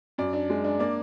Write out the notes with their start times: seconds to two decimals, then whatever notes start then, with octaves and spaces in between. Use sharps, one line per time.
0.18 F#2 D5
0.33 D4
0.50 G#3
0.64 D4
0.79 A#3 D5